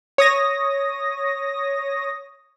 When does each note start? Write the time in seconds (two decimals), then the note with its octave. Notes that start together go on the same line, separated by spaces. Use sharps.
0.18 C#5 D#6 A#6